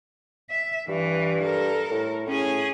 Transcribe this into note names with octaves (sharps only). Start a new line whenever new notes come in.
E5
G2 E3
A4 A#4
A2
A2 C#4 G#4